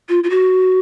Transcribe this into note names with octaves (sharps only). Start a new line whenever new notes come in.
F4
F4
F#4